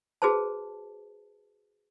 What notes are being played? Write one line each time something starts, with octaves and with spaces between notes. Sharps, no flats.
F#4 G#4 B4 C5 A5